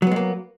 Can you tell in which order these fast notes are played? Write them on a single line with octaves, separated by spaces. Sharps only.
F#3 B3 G#3 A#3